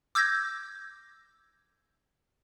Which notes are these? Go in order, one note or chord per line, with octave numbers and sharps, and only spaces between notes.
D6 E6 G6 G#6 A#6